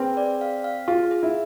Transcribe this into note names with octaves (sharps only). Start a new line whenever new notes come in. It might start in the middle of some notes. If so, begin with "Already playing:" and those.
Already playing: C4 G#4 B4
D5
F5
F5
F4 G#4
G#4
E4